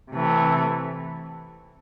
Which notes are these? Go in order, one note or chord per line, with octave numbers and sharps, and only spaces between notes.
C3 E3 A3